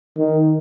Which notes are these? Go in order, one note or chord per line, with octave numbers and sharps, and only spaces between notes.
D#3